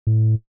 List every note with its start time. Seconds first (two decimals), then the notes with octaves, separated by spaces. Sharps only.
0.07 A2